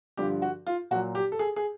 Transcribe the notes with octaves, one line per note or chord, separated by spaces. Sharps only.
G2 D3 F3 G4
F#4
F4
A#2 F#3 F#4
G4
A4
G#4
G#4